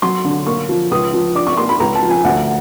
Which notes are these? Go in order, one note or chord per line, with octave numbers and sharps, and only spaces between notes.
F#3 C6
D3
A#3 C#6
F3
C#2 D#6
F3
D4 D6
C#6
A#3 C6
B5
C#2 A#5
A5
F3
G#5
D2 F#5